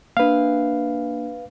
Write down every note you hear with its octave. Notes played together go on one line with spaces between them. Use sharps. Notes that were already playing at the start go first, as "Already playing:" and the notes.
A#3 D4 B4 F5